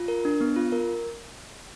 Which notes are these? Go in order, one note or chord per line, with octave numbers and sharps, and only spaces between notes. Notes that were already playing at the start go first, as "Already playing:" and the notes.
Already playing: F4
A#4
D4
B3
F4
A#4